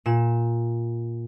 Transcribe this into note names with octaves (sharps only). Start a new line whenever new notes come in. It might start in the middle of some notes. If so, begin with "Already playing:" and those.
A#2 E7